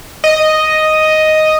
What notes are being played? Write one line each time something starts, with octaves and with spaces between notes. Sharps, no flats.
D#5